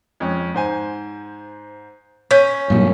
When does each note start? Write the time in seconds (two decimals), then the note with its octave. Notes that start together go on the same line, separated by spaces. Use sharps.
0.20 F2 G#3 C#4
0.54 G#2 C5 G#5
2.31 C#4 G6 B6
2.70 G2 A#2 F#3